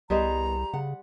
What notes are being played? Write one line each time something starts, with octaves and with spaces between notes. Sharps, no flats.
C2 G3 B3 G#4 C5 D#5 A#5
C#3 F#5